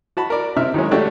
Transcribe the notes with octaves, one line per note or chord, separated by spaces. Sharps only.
F#4 A5 B5
A#4 D5
C3 E5 F6
D#3 F#3 G#3 C#4
A3 C#4 D4 F#4 G4 A4